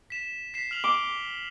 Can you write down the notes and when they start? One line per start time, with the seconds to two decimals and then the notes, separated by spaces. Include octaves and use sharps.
0.10 B6 E7
0.54 B6 C7 E7
0.71 F6 F7 F#7
0.84 D6 G7